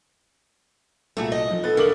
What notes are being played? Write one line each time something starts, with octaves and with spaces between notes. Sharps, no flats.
C2 A#2 A3 F#4 G#4
D#5
D#3 F3 D#4
B3 A4 F#6 A6
D2 C#3 A#4 D6 F#7